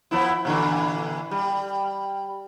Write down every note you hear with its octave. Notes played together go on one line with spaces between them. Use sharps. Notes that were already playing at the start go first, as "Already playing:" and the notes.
F3 B3 E4
A#2 D3 E3
G3